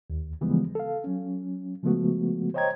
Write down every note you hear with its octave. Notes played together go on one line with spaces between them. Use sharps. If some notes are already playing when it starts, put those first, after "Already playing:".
D#2
C#3 E3 F3 G3 G#3 B3
A4 F5
F#3 C#4
C#3 F3 G#3 A3 B3 F#4
C5 C#5 D#5 G5 A#5 G#6